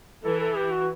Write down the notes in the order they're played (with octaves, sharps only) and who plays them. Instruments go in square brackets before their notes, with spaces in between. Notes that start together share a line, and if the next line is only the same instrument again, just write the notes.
[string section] E3 [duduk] A4
[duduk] A4
G4
F#4